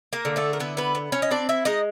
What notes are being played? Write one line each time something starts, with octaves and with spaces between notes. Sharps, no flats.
A#3 A#4
D3
A3 A4
A#4
B3 E4 B4
B3 B4
B3
C#4 C#5
D#5
C4 D4 D5
E4 E5
G#3 D#4 D#5